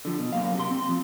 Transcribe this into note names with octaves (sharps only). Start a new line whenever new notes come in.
D3 F3
B2
F#2 A#3 F5
C3 C6
C4
F3